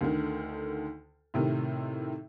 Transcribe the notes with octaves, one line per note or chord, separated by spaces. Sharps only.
D2 D3 D#3
A2 C3 D#3